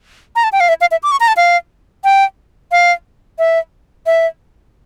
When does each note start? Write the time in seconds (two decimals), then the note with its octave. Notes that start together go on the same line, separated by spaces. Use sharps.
0.36 A#5
0.44 A5
0.52 G5
0.60 F5
0.69 E5
0.81 F5
0.91 E5
1.03 D6
1.12 C#6
1.20 A#5
1.28 A5
1.37 F5
2.04 G5
2.72 F5
3.39 E5
4.06 E5